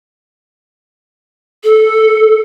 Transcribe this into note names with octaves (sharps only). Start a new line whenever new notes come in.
A4